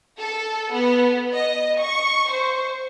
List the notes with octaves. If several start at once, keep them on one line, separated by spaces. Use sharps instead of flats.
A4
B3
D#5
C#6
C5